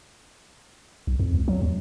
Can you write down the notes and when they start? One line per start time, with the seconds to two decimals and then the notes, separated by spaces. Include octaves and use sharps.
1.07 B1
1.20 F2
1.34 C#2
1.48 F#3
1.62 D#2